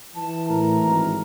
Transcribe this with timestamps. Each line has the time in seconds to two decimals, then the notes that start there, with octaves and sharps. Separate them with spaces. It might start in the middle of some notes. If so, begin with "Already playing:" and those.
0.15 E3 A5
0.49 A2 A#4 A#5
0.83 G#1